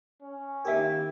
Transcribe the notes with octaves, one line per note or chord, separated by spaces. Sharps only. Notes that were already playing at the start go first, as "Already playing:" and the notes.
C#4
D#3 A#3 E4 G4 A#4 E5